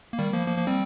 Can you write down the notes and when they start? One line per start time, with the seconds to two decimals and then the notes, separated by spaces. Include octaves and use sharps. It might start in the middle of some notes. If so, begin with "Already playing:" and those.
0.13 A#3
0.19 D#3 G3
0.33 F3 A#3
0.47 F3 A#3
0.57 F3 A#3
0.67 G3 C4